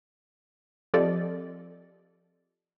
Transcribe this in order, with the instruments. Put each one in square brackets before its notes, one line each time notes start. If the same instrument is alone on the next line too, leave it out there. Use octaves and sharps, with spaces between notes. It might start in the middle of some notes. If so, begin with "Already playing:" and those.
[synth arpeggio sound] F3 C4 G4 A4 D5 D#5